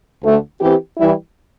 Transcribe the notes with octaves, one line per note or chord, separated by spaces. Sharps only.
D2 D3 A3
E3 C4 G4
E3 G3 E4